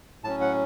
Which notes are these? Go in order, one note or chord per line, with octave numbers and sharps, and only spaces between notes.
A2 F#3 C#4 A5
F#5